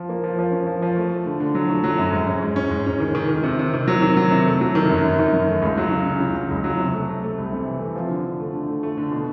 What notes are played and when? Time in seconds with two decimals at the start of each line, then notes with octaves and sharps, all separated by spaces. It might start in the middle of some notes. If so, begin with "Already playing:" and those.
Already playing: F3
0.09 A#3
0.24 F3
0.39 F3
0.52 C#4
0.67 F3
0.82 F3
0.96 A3
1.11 A3
1.26 D3
1.40 D3
1.55 F#3
1.70 A3
1.84 F#3
1.98 F#2
2.12 G#2
2.27 C#4
2.42 G#2
2.56 C#4
2.71 G#2
2.86 C#4
3.00 D#3
3.15 D#3
3.29 D#3
3.43 C3
3.59 C3
3.74 D#3
3.88 F#3
4.02 D#3
4.17 F#3
4.32 C3
4.46 A3
4.61 F#3
4.75 D#3
4.89 F#2
5.04 F#2
5.19 D#3
5.33 F#2
5.48 A3
5.62 C#2
5.77 F#3
5.91 C#3
6.06 C#3
6.20 C#3
6.36 F#3
6.51 C#2
6.64 F#3
6.79 C3
6.94 A3
7.08 A3
7.22 A3
7.38 C2
7.52 C3
7.67 E3
7.81 A3
7.95 F3
8.10 D3
8.24 D3
8.40 A3
8.53 D3
8.68 A3
8.83 A3
8.97 D3
9.12 B2